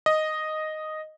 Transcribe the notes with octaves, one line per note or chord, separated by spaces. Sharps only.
D#5